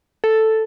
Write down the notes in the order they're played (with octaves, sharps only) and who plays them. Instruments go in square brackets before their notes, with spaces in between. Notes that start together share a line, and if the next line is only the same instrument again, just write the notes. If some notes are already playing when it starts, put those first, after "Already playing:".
[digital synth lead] A4